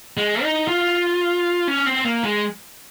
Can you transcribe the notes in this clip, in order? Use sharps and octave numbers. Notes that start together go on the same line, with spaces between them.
G#3
D#4
F4
C#4
C4
A#3
G#3